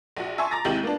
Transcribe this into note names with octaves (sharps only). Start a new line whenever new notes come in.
A#1 F#4
E5 G#5 A5 C6 C#6
A#5 D6 A6 A#6
D#2 C3 G#3 E4 G4 F#7
A#3 B3 D4